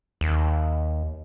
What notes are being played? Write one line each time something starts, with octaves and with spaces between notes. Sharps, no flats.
D#2